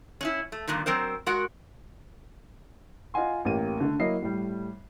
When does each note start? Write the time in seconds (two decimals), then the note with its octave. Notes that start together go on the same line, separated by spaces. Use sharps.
0.21 C#4 D#4 E4
0.52 A3
0.68 G2 A#2 D3 D#3
0.86 F#3 C4 A#4 C5
1.26 G#3 F#4 A#4 F#5
3.14 F4 D#5 F#5 G#5 C6
3.45 A1 A#3 G4 D#7
3.80 D3 A3
3.99 F#3 A#3 E4 D#5 C7
4.22 A2 G3